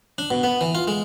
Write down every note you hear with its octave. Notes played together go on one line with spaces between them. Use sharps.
D4
B2
B3
E3
F4
G#3